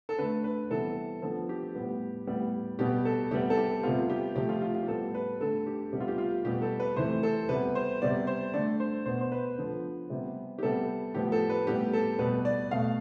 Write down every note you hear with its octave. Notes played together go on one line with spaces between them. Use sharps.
A4
D3 A3 B4
B4
C3 E3 G3 B3 A4
D3 F3 B3 A4
G4
A2 G3 B3
A2 G3 B3
B2 G3 B3 G4
A4
C3 G3 B3 G4
A4
G4
C3 G3 B3 F4
G4
C3 F3 A3 G4
F4
F4
F4
G4
A2 G3 B3 A4
B4
D3 A3 A4
G4
C3 G3 B3 G4
F4
G4
F4
B2 G3 B3 G4
A4
B4
C3 E3 A3 C5
A4
C3 G3 B3 B4
C5
C3 G3 B3 D5
C5
D3 A3 D5
C5
B2 B3 C5
C5
B4
D3 F3 B3
C3 G3 B3
G4
C3 G3 B3 A4
A2 F3 B3 G4
A4
B4
A2 G3 B3 G4
A4
B2 G3 B3 B4
D5
B2 A3 F5